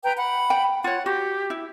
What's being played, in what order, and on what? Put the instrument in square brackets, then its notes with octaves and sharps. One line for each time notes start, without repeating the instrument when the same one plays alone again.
[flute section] B4 G5 A#5
F#5 B5
[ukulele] G5
[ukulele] F4 C#5 [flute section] F#5
[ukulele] F#4 [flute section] G4
[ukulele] E4